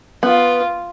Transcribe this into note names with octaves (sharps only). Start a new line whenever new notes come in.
B3 F4